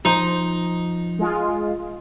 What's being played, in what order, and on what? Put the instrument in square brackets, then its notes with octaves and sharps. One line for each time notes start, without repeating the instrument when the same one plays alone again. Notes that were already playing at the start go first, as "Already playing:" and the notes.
[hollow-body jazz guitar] F3 C5 [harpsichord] D#4
[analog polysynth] G#3 F4